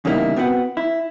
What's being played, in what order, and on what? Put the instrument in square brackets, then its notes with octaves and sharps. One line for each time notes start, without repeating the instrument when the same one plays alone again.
[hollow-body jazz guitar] E2 C#3 G3 A#3 D#4 E4
B3 C4 F#4 B4 F#5
E4